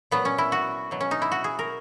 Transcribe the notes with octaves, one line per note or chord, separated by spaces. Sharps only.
A#2 F#3 B3
C#4
E4
F#4
B2 F#3
C#4
D#4
E4
F#4
G#4
A#4